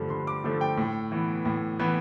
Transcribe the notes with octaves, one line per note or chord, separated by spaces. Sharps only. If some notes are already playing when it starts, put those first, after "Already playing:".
Already playing: G2 D3 F3 A3
G2 C6
D6
D3 F3 A3
G5
A2
E3 B3
A2
E3 B3